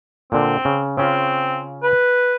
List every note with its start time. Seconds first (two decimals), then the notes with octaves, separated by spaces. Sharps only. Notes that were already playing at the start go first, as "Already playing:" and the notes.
0.32 A#2 D3 C4
0.65 C#3
0.97 C#3 C4 C#4 F4
1.83 B4